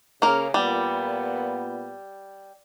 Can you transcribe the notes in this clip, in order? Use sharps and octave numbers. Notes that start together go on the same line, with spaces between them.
C#3 A#3 A#4
A#2 G3 B3